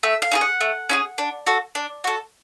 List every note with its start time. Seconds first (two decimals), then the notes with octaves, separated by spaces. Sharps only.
0.03 A3 E5
0.22 F5
0.31 C#4 E4 G#4
0.41 F#5
0.61 A3
0.89 C#4 E4 G#4
1.18 D4
1.47 F#4 A4
1.75 D4
2.04 F#4 A4